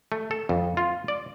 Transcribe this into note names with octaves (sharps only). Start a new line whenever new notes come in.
A3
A4
F2
F4
D5